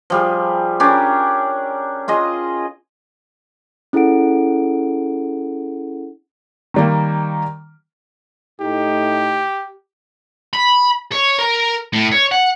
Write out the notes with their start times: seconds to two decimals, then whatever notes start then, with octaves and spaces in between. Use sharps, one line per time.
0.10 F3 G3 G#4
0.80 C#4 D4 G4 A#4
2.08 F4 G#4 D#5
3.93 C#4 E4 G#4 A4 F#5 D7
6.74 D#3 G3 A#3
8.61 A2 D#4 G4
10.53 B5
11.12 C#5
11.39 A#4
11.93 A2
12.12 C#5
12.31 F#5